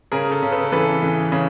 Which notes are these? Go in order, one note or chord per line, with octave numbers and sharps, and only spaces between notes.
C#3 G#4 A#4
A4
C#3
A4 B4
E3 A4 B4
E3
C#3